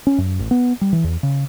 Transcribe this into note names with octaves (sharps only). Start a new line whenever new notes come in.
C#4
F#2
A1
B3
G3
E3
E2
C#3